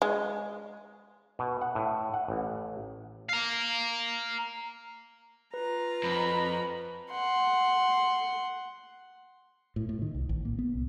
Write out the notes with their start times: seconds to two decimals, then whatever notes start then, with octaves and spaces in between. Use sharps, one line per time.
0.02 G#3
1.39 B2
1.62 F#5
1.75 A2
2.14 F#5
2.28 A1
3.29 F5 A#5
5.54 F4 B4 A#5
6.03 F2 B5
7.11 F#5 C6
9.76 A2
9.89 A2
10.02 D#3
10.14 C2
10.29 A1
10.45 A#3
10.59 B3
10.74 C2